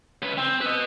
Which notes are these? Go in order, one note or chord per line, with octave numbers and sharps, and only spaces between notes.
C#3 B4
C4
B4 D#5